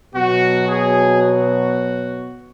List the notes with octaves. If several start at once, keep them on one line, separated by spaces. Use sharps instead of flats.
B2 F#3 F#4
G#4
F#4